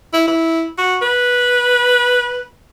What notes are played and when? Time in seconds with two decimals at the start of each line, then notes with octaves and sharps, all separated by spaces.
0.13 E4
0.27 E4
0.78 F#4
1.02 B4